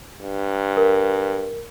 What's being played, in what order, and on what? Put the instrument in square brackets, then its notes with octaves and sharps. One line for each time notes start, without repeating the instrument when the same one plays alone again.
[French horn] G2
[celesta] A#4